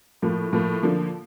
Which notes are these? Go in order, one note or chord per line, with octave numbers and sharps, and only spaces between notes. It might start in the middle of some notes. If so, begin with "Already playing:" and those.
A2 F3 A#3
A2 F3 A#3
D3 F3 A#3